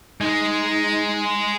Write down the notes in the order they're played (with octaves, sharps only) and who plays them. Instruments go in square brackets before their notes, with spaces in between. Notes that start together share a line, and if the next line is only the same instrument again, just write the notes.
[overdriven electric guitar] G#3 [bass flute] D#4